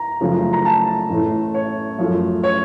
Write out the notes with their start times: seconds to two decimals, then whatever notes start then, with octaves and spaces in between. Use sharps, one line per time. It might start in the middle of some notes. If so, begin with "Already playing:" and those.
Already playing: A#5
0.21 F#1 F#2 C#3 F3 A3
0.53 A#5
0.65 A5
1.10 A1 A2 A3
1.54 C#5
1.99 F#2 F3 A3
2.43 C#5